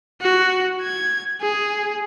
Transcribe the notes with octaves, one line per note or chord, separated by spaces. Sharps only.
F#4
G#6
G#4